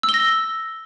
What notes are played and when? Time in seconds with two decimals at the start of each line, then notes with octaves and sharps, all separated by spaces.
0.03 E6
0.09 G7
0.14 A#6